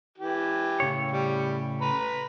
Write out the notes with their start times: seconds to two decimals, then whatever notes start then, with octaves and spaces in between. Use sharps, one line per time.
0.18 E3 G4
0.80 A2 C#3 C#5
1.11 G3
1.81 B4 A#5 B5